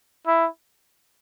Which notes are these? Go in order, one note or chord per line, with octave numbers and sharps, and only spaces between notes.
E4